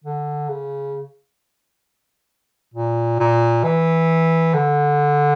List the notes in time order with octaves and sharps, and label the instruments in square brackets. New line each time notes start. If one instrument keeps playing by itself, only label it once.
[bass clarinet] D3
C#3
A#2
A#2
E3
D3